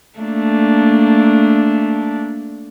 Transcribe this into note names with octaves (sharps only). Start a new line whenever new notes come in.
A3 A#3 D4